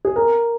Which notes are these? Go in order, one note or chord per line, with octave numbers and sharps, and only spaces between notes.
G#4
A#4